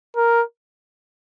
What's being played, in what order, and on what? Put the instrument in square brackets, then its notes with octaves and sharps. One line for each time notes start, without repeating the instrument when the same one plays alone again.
[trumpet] A#4